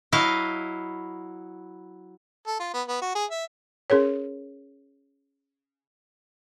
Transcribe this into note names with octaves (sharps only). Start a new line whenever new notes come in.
F#3 E4 D#5 F5
A4
F4
B3
B3
F#4
G#4
E5
C#4 G#4 A#4 C#5